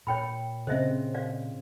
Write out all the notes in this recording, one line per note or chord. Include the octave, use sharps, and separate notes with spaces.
A#2 C#5 G5 B5
C#3 C4 C5 D#5 E5
D5 F5